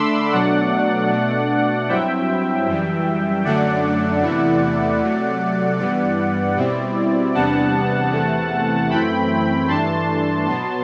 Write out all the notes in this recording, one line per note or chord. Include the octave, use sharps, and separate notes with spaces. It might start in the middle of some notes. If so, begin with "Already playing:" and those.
Already playing: D3 A3 D4 B5 C6 D6 E6
B2 F#3 A3 D4 D5 F#5
B2 A3 D4
G2 F#3 C4 E4 E5 G5
F#2 E3 G3
F#2 D3 F#3 A3 D4 D5 F#5
E2 C3 E3 A3 E4
C3 F#3 A3
G2 E3 G3 B3 D5
B2 G3 C4 E4
E2 C3 G3 B3 D4 F#5 A5
E2 C3 E3 A3
F#2 E3 A3 C4 E4 G5 B5
G2 E3 A3 D4 A5 C6
B2 F#3 B3